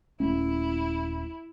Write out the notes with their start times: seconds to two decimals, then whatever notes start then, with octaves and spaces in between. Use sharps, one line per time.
0.20 D#1 A3 C#4 E4